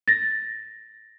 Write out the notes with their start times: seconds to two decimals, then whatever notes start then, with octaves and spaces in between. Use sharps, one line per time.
0.08 A6 A#6